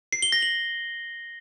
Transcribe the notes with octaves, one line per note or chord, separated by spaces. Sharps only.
C7
G7
A#6
F#7